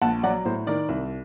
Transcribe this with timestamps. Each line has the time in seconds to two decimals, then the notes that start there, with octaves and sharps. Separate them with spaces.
0.02 A#1 F#5 A5
0.23 F#3 D5 F#5
0.45 A2 C5
0.67 D#3 A#4 D5
0.89 C2